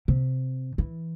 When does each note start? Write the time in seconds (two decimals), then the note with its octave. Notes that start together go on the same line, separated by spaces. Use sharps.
0.08 C3
0.78 E3